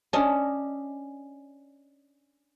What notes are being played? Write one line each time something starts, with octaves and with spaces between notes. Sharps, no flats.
C#4 D4 D#5